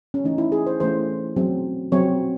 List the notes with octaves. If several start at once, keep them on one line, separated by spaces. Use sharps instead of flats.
C#4
E3 A3 C#4 D#4
E4
G#4
C5
E3 A3 C#4 C5
F#3 C4
F#3 C4 C#5